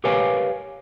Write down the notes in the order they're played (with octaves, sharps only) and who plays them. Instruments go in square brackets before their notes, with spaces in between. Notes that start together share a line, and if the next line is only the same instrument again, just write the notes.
[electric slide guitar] G4 A#4 B4 C#5 F5 G#5